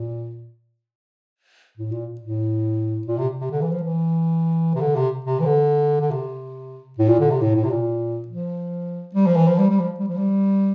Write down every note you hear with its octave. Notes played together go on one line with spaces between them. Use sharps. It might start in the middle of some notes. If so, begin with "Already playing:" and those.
Already playing: A#2
A2
A#2
A2
A#2
C3
C3
D3
E3
F3
E3
C3
D3
C3
C3
E3
D3
D3
C3
A2
A#2
D3
C3
A2
A2
C3
A#2
F3
G3
F3
E3
F3
G3
G3
F3
G3
F3
G3